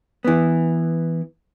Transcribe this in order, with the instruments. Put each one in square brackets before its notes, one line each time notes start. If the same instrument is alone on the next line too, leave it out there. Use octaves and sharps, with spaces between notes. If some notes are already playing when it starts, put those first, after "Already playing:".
[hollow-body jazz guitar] E3 B3